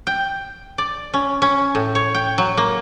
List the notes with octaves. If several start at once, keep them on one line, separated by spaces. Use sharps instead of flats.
G5
D5
C#4
C#4
A2
C#5
G5
F#3
A#3